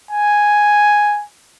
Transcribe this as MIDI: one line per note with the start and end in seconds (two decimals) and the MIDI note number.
0.11 1.23 80